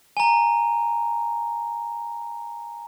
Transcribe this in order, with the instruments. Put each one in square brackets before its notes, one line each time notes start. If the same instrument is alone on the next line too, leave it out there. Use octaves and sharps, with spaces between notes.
[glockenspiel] G#5 A#5